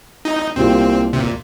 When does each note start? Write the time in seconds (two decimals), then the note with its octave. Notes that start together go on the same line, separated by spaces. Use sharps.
0.25 D#4
0.56 C2 A#2 A#3 C4 G4
1.13 C3
1.20 A#2